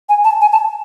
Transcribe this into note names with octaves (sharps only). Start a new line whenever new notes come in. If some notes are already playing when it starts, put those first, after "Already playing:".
G#5
A5
G#5
A5